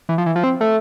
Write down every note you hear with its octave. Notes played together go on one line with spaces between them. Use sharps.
E3
F3
E3
F3
C4
A3